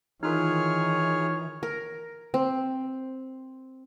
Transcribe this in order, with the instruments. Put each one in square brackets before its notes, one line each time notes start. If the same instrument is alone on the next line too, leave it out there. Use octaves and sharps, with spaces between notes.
[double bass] D#3 E3 [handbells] D#4 F4 A#4 [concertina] G#4 F6 [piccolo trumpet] C#5
[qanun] A#4
C4